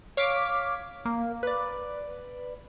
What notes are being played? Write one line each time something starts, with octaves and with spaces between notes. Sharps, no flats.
C#5 F5 D6 B6
A#3
B4 D5